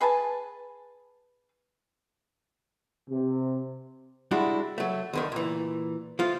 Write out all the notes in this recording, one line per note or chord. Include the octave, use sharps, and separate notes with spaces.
G#4 B4 G#5 A5
C3
G3 G#3 D4 E4 F#4
F#3 A3
C#2 D3 D#3
A#2 E3
F3 A3 F4